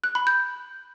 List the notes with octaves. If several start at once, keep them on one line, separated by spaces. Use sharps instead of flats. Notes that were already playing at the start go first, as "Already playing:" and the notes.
F#6
B5
G6